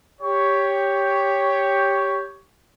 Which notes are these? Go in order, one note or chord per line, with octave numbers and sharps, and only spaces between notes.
G4 C#5